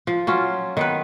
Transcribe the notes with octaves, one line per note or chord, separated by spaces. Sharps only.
F3
F#3 C#4 F4
D#3 B3 B4